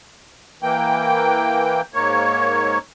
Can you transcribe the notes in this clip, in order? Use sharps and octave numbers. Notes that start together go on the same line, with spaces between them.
E3 A#3 G5
G#2 A#3 C#5